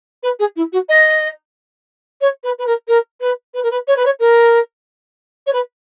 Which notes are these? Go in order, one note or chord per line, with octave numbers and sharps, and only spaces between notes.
B4
G#4
E4
F#4
D#5
C#5
B4
B4
A#4
A#4
B4
B4
A#4
B4
C#5
B4
C#5
A#4
C#5
B4